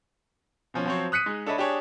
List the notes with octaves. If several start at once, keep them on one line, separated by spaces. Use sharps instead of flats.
B2 F3 C#4
F3 F#3 C4 C5 C#5
D#6 F#6 B6 C#7 D#7
G#3 D#4
D4 A4 C#5 D#5 E5 B5
D4 G4 G#4 C#5